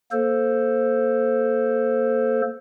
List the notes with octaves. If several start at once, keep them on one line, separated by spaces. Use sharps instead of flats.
A#3 A4 C5